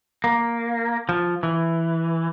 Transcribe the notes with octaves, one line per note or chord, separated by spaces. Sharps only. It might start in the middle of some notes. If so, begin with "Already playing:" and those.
A#3
F3
E3